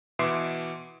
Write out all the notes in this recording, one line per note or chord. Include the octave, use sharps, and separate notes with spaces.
B2 E3 E5 C6 D6 C7